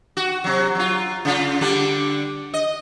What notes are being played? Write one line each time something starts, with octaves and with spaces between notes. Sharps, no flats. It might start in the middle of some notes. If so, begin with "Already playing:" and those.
F#4
C3 F#3
F#3 F4
C#3 F4
D3 G3 D4
D#5